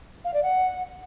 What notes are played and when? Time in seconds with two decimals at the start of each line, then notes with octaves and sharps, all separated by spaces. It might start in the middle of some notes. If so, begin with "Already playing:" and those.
0.24 F5
0.34 D5
0.43 F#5